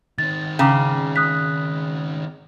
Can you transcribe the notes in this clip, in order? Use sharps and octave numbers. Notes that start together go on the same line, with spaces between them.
D#3 C4 A6
C#3 G5 A#5 D6
D#6 F#6 B6